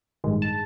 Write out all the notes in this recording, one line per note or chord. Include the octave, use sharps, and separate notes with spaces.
A1 G2 D#3 G#3
A5